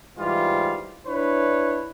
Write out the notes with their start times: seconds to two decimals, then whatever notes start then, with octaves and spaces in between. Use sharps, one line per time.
0.19 G#2 E3 G3 F4
1.07 D4 E4 B4 C#5